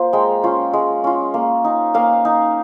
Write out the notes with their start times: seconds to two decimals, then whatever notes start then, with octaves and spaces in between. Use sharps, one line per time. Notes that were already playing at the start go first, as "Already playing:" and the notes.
Already playing: A#3 F4 C5
0.13 G#3 G5 A#5
0.44 C#4 F4
0.73 G#3
1.04 C#4 F4
1.34 A#3
1.64 D#4
1.94 A#3 F5 G#5
2.25 D#4